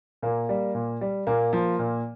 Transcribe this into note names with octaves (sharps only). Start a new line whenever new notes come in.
A#2 A#3
G3
A#2
G3
A#2 A#3
F3
A#2